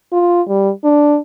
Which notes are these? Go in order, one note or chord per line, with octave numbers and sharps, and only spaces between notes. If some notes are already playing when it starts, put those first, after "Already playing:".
F4
G3
D4